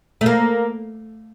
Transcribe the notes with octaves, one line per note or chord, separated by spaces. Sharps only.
A3
A#3